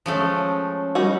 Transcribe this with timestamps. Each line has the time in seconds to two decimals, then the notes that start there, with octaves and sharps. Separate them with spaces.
0.06 F3 G#3 A3 C#4 C#5
0.95 G3 D#4 F#4